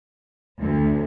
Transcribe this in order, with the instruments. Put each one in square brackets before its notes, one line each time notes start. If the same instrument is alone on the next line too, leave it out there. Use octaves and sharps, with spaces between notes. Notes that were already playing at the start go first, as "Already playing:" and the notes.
[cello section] D2